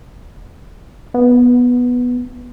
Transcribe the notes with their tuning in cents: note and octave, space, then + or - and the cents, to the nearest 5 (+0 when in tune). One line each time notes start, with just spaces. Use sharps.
B3 -5